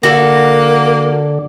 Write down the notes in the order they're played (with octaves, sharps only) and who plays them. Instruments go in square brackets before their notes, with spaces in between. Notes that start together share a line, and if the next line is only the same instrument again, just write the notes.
[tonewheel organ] D3 [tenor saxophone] A#3 [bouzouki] F#4 A4 F#5